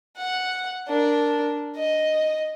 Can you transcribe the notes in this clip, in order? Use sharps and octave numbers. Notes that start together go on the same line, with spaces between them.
F#5
D4 A#4
D#5